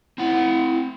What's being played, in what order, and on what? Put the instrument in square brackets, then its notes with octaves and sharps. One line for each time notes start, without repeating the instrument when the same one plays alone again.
[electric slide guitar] C4 F#5 [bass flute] E4